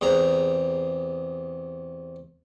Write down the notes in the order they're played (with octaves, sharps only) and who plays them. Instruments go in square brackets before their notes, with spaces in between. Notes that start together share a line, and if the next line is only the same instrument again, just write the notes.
[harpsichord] E2 C3 G#4 A#5